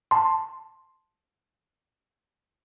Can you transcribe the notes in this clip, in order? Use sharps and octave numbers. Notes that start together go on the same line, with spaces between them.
A5 C6